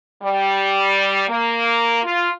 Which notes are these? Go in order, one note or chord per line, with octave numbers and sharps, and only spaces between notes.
G3
A#3
F4